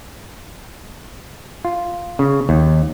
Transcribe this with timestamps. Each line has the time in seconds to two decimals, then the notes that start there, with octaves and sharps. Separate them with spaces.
1.65 F4
2.19 C#3
2.49 D#2